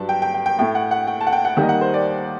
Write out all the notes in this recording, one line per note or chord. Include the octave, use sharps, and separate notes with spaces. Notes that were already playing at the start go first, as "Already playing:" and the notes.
Already playing: G2 F#3 A5
G5
G5
G5
G5
A2 A3 G5
F#5
F#5
G5
A5
F#5
G5
F#5
D#2 D#3 G3 A#3 F#5
D#5
F#5
C5
D5